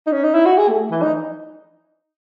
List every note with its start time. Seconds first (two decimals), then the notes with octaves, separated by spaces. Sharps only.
0.06 D#4
0.12 C#4
0.24 D#4
0.34 E4
0.46 F#4
0.58 G#4
0.69 A3
0.91 E3
1.02 D#4